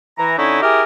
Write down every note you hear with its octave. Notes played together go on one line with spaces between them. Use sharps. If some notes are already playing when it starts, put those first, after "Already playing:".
E3 A#5
D3 C#4 D#4 E4
E4 G4 G#4 A#4